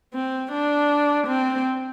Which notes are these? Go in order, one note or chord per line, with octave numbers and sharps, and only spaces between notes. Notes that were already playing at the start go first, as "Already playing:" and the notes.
C4
D4
C4